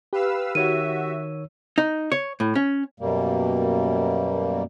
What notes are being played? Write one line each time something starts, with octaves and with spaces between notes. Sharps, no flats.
G4 B4 F5 E6
D#3 F#4 C#5 E5 E6 D#7
D#4
C#5
A2
C#4
F#2 B2 G3 A#3